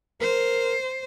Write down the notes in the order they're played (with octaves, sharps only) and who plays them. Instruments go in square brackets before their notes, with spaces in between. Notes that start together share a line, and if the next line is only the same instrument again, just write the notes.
[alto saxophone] A#4 [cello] C5